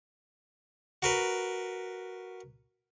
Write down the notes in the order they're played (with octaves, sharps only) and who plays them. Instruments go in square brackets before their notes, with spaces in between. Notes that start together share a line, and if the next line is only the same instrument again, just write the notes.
[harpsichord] F#4 A#4 B4